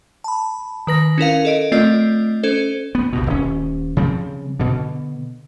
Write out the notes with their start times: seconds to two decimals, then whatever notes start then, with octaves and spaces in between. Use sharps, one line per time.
0.24 A5 B5
0.87 D#3 B4 A#6
1.18 C#4 E4 A#4 F5
1.45 A4 D#5 D7
1.72 A3 C4 F4 D5 D#5
2.43 C#4 A4 C5
2.95 B3
3.13 C2 G2 B2
3.27 D#1 C#4
3.97 C#3 F3 G3 C4
4.60 B2 D3